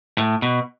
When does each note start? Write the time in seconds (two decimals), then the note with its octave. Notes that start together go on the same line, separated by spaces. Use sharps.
0.18 A2
0.42 B2